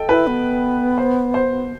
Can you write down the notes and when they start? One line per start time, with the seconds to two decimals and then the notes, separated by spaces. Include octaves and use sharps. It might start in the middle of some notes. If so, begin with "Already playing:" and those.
Already playing: A4 D#5 G5
0.09 E4 B4
0.27 B3
0.98 C5
1.34 C5